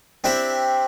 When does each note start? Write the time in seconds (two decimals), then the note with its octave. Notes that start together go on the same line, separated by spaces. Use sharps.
0.24 C4 D4 E4 G4 E5 G5